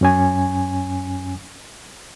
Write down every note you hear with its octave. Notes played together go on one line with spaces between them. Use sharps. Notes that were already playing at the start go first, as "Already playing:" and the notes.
F#2 C#4 G#5